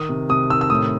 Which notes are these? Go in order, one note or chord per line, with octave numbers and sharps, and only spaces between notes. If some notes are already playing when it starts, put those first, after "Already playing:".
Already playing: D#3 D#6
C3
C3 D#6
D#3 E6
E6
A2 D#6